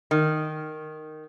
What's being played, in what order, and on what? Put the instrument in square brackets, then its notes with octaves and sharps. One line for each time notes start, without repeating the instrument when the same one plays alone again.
[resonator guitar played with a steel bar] D#3